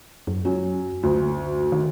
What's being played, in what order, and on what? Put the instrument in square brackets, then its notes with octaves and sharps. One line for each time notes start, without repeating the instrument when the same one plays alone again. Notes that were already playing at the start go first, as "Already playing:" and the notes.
[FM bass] F#2
[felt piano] F#3 C#4
D2
[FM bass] D#3